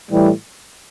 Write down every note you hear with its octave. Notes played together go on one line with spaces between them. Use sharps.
A2 E3 G3